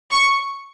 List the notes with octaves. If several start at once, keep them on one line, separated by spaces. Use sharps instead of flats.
C#6